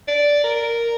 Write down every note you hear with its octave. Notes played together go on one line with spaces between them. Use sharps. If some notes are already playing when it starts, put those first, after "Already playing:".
D5
A#4